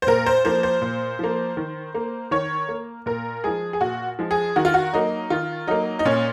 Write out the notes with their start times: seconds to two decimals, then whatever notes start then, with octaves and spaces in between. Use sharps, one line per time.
0.02 C5
0.07 A#2 A#4
0.26 C5
0.45 F3 A#3 C5
0.63 C5
0.82 A#2
1.19 F3 A#3
1.57 D#3
1.94 A#3
2.31 D#3 C#5
2.68 A#3
3.06 A#2 A#4
3.44 F3 G#3 G#4
3.73 G#4
3.80 A#2 F#4
4.19 F3 G#3
4.31 G#4
4.56 D#3 F#4
4.65 F4
4.74 F#4
4.93 F#3 A#3 D#4
5.30 D#3 F4
5.67 F#3 A#3 D#4
5.99 D#4
6.05 A#2 C#4